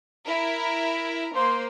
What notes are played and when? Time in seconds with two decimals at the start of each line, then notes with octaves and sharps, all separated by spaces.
0.25 E4 A#4
1.34 A#3 C5 C6